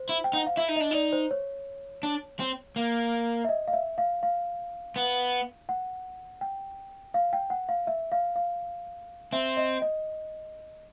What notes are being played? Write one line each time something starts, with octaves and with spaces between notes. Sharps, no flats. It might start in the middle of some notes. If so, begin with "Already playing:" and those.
Already playing: C5
E4
G5
D#4 F#5
F5
E4 E5
D#4
D4 D#5
D#4 D5
C5
C#5
D4
C4
A#3
E5
D#5
F5
E5
F5
F5
B3
F#5
G5
F5
G5
F#5
F5
E5
F5
F5
C4 E5
D#5
D#5